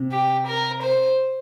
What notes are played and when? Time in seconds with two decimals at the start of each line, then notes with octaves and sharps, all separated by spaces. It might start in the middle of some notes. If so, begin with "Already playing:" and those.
Already playing: C3
0.12 G4
0.47 A#4
0.82 C5